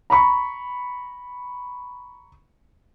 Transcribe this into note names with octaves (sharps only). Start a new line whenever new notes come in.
A#5 B5 C#6